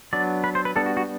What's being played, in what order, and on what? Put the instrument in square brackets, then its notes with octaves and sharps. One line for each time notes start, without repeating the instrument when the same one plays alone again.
[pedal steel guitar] F#3 B3 D4 D5
B4
C5
B4
G3 B3 D4 A4
F#4
F#4